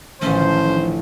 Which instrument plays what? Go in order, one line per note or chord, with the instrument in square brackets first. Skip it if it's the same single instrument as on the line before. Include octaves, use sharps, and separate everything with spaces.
[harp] A1 A3 [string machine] D3 F3 [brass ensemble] D#3 C5 [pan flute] C#4